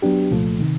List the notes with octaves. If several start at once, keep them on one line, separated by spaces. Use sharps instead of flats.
F#3 B3 D4 G4
C2 A#2 F3 A3
C3 D#3